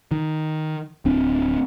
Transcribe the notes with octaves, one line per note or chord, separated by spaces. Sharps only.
D#3
D1 C4 D4